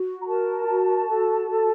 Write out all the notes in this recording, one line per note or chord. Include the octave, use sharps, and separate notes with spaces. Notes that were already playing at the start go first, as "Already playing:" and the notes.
Already playing: F#4
A#5
A#4 A5
F#4
A4
A4